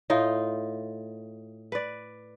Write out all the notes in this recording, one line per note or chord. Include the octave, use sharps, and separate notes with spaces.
A2 D#4 F4
B4 D5